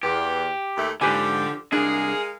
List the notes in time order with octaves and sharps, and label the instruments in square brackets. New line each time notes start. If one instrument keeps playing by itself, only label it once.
[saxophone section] E2 [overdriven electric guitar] G4
[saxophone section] D#2 A3
[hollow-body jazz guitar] G#2 B4 G#5 [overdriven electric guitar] D3 [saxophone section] F3 G4
[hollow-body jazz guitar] C2 D4 [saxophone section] G#3 A#4 F5 [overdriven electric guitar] G#4